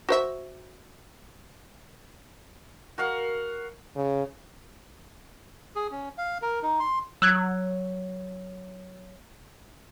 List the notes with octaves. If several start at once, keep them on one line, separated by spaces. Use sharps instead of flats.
F#4 C5 E5
F#4 A#4 F5 F#5
C#3
G#4
C#4
F5
A#4
D#4
C6
F#3 E6 F#6 G#6